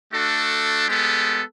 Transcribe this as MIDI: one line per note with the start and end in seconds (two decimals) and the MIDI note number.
0.14 0.88 57
0.14 0.88 62
0.14 0.88 66
0.14 0.88 69
0.88 1.42 56
0.88 1.42 59
0.88 1.42 67
0.88 1.42 69